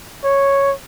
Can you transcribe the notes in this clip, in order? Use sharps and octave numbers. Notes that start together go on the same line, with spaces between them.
C#5